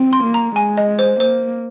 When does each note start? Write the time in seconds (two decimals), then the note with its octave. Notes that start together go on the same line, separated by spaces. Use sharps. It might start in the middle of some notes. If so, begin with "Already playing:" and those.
Already playing: C4
0.13 C6
0.24 A#3
0.34 A#5
0.56 G#3 G#5
0.77 D#5
0.99 C5
1.20 A#3 C5